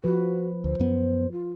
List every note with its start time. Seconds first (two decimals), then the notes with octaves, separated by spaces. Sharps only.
0.04 F3 F#4 B4
0.64 D2 C5
0.79 F#2 B3
1.32 F4